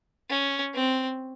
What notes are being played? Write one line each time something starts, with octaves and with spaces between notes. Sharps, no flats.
C#4
C4